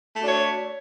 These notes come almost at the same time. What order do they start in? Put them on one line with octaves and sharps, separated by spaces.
A3 F#4 D4 C#5